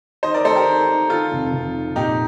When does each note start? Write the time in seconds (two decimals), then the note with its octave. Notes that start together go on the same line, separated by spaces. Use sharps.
0.23 D#3 C5 D#5
0.34 A#4 D5
0.45 A3 A4 C5
0.56 G4 A#4
0.67 D#3
0.89 D#3
1.10 D#3 F4 A4
1.32 F1
1.52 F1
1.74 D#3
1.96 A#2 D#4 G4